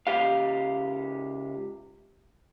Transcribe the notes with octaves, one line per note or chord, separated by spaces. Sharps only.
C#2 G4 F5